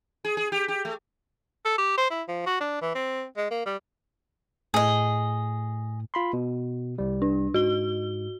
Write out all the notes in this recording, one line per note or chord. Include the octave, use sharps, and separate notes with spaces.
G#4
G#4
G4
G4
A3
A4
G4
C5
E4
F3
F#4
D4
E3
C4
G#3
A#3
G3
A2 G#4 D#5
F4 B5 C6
B2
C2 G3
D4
G#2 F#4 G7